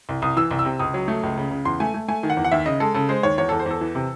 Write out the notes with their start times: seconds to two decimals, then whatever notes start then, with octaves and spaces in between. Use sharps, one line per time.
0.09 C2
0.22 C2 D#6
0.37 E3 E6
0.51 C2
0.59 E6
0.65 C3
0.79 C#2 D#6
0.94 F#3
1.08 A3
1.23 C#2
1.37 C#3
1.51 C#3
1.65 E2 C6
1.80 A3 G#5
1.94 A3
2.08 A3 G#5
2.23 D#3
2.30 F#5
2.37 E2
2.44 F#5
2.52 D#2 E5
2.66 C#3 D#5
2.80 G#3 A4
2.94 C#3 A4
3.09 G#3 C5
3.23 D#2 C#5
3.38 E2 C#5
3.49 E2 A4
3.60 C5
3.66 E2 A4
3.81 E3
3.95 C3